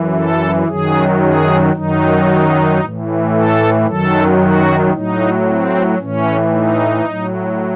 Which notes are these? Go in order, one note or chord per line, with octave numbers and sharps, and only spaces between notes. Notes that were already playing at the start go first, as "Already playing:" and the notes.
Already playing: F#2 E3
A4
F#2 D#3 F#3 G#4
G#4
F#2 D#3 F#3 D#4
A2 E3
A4
F#2 D#3 F#3 A4
F#4
A2 F#3 D#4
C4
A2 E3 C#4
D#4
A2 F#3